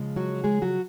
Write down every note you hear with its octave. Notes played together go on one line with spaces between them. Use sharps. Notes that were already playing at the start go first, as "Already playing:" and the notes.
Already playing: C#3 F3 G#3
F#3 F#4
G#3 G#4
F#3 F#4